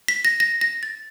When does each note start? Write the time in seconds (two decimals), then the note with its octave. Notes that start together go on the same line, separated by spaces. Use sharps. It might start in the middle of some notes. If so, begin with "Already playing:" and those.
0.08 B6
0.25 A#6
0.40 A#6
0.61 A#6
0.83 A6